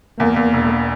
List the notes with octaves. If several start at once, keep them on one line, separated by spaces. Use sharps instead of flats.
E2 A#3
E2
E1